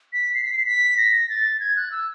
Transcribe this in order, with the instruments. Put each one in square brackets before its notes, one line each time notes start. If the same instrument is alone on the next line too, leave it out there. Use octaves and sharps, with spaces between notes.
[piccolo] B6
C7
B6
C7
B6
A#6
A6
G#6
F#6
E6